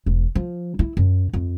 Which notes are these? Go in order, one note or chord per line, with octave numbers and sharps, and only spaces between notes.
E1
F3
E4
F#2
F2